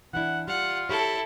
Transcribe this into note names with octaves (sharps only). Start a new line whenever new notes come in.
E3 D4 E4 F#5
G3 F4 F#5
E4 G4 A4 C#5